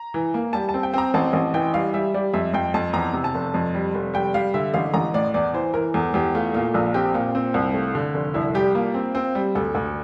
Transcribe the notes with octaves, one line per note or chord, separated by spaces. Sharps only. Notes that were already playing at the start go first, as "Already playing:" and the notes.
Already playing: A#5
E3
A#3
G3 A5
A5
C4
G5
C4 A#5
A1 A5
A1
E3 G5
G3 F5
G3 E5
G3 D5
F2 E5
F2 G5
F2 A5
E2 A#5
C3
A5
F1
F2
G3
F1
G3 G5
G3 F5
D3 E5
A1 F5
A1 A#5
A2 D5
E2 D5
E3 C5
E3 A#4
E2 A4
E2 G4
A3 F4
A#2 F4
A#1 F4
C4 G4
A#2 F4
C4
C2
A3
D3
F1
C2 E4
G3 G4
A#3 F4
C4
C4
G3
D2 A4
D2